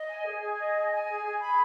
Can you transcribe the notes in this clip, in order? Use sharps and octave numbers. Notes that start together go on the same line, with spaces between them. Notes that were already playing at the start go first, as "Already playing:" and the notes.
Already playing: D#5
G#5
G#4
G#4
D#5
G#5
G#5
G#4
G#4
B5